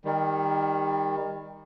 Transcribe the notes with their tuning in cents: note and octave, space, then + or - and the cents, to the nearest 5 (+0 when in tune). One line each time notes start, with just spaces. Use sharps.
D#3 +5 G3 +25